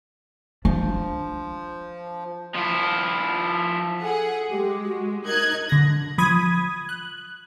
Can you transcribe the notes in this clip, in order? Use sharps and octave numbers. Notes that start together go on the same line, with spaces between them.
F3 D4
F3 E4
G#4 A4 F#5
G#3 G4
F#4
D#4 A#4 F#6 G#6
D3 A#6
F3 B5 D#6 G#6
F#6